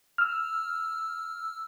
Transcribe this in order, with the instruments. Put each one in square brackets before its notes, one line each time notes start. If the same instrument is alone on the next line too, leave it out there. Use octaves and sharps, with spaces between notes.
[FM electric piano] E6 F6